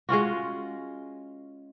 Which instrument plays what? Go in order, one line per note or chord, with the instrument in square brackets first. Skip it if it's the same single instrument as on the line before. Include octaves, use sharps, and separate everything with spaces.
[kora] G#3 C#4 F4 F#4